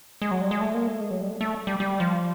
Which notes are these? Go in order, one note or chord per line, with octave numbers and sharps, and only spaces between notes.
G#3
F#3
G3
G#3
A3
A#3
A3
G#3
F#3
G3
A3
A3
G3
G3
F3